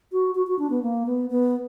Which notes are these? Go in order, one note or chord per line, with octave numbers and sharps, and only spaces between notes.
F#4
F#4
F#4
D4
B3
A#3
B3
B3